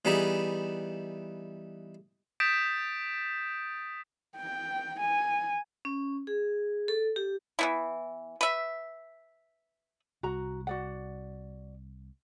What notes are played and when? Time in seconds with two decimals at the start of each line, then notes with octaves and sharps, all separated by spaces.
0.05 E3 G3 B3 D#4 E4 G#4
2.40 D#6 G6 A6 B6 D7 E7
4.37 G5
5.00 G#5
5.85 C#4
6.27 G#4
6.88 A4
7.16 G4
7.59 E3 B3 E4
8.41 B4 E5
10.23 C2 F#4 A#5
10.67 F#4 D5 F#5